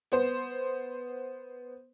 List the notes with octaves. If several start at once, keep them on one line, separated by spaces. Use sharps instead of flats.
B3 C5